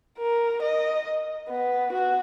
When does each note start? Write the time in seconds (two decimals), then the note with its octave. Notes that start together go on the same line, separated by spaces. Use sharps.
0.18 A#4
0.62 D#5
1.49 B3
1.92 F#4